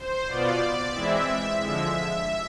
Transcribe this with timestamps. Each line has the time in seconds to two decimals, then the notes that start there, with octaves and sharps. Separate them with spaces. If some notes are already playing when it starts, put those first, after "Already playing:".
Already playing: C5
0.27 B2 B3 F4 D5
0.92 E3 G#3 C4 E4 E5
1.58 D3 F3 G#3 E5